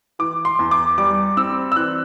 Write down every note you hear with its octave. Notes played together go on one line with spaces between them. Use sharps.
E3 D6
C6
E2
D6
G3 D6
C4 E6
E6
E3 F#6